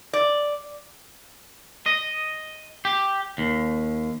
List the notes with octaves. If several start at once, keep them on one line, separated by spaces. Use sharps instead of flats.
D5
D#5
G4
D#2